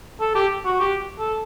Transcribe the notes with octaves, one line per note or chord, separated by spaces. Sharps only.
A4
G4
F#4
G4
A4